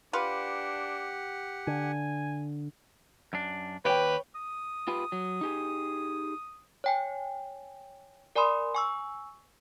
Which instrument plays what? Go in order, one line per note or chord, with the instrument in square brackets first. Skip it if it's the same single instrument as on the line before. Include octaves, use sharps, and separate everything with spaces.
[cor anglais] D4 [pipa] F4 B4 [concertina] G4 F#5
[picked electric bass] D3 [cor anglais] G#5
[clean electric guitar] F#2 D4
[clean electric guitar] D#2 G4 [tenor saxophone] B4 [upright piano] C#5 G5
[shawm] D#6
[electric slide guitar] F4 G4 B4
F#3
D#4 G4 G#4
[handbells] C#5 G5 G#5
A#4 D5 G#5 B5 C6 D#6
G#5 C#6 E6